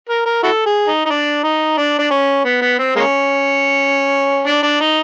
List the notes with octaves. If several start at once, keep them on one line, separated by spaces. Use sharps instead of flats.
A#4
A#4
E4 F#4 A4
G#4
D#4
D#4
D4
D#4
D4
D4
C#4
B3
B3
C4
G#3 A#3 C#4
D4
D4
D#4